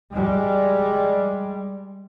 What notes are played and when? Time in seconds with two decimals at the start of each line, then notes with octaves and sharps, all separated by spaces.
0.12 G3 G#3